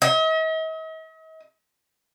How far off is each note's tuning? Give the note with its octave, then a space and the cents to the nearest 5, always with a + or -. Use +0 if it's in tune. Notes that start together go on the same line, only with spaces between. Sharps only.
D#5 +45